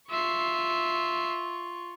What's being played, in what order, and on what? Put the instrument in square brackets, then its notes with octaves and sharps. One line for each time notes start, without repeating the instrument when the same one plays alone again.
[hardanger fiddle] F4 C#6 [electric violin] E5 C7